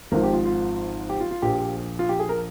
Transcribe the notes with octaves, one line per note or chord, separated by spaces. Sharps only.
G#1 G#2 F3 A#4
G4
F4
F4
G4
F4
F4
A#1 A#2 F3 G4
F4
G4
G#4
A#4